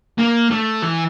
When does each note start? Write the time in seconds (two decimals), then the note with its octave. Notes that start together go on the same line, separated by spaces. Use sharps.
0.18 A#3
0.51 A3
0.82 E3